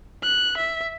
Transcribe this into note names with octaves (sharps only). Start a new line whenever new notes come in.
F#6
E5